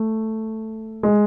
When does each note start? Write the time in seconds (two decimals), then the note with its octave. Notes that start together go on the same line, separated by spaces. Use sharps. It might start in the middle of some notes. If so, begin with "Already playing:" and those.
Already playing: A3
1.03 G#3